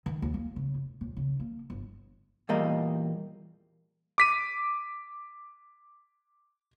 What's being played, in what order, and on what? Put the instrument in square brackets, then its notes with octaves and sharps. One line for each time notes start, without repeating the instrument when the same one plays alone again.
[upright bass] D#3
D#2
A#3
C#3
F1
D#1
C#3
A#3
G1
[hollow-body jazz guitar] E2 A#2 G3 A#3 D#5
[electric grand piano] D6 B6 D#7